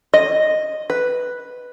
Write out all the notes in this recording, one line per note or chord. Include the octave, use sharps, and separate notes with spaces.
D#5
B4